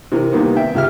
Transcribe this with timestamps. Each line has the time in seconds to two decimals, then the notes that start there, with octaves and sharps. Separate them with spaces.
0.12 C3 E3 A#4
0.32 C3 D#3 G3 A#3 B3
0.56 E5 G5
0.75 C#2 C#3 G4 E5 F6